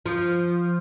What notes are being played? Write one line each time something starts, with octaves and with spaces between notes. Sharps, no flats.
F3